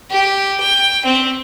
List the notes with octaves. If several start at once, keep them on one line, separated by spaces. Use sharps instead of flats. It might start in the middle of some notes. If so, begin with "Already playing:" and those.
G4
G5
C4